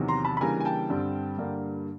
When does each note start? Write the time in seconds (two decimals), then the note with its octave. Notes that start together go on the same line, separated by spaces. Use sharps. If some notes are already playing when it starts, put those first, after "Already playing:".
Already playing: E2 C3 D#3 F#3
0.08 A#5 C6
0.25 A5 B5
0.37 B5
0.41 C#3 E3 G3 A#3 D4 G#5 A#5
0.60 G#5
0.65 G5 A5
0.90 G2 D3 G3 C4
1.38 G2 D3 G3 A#3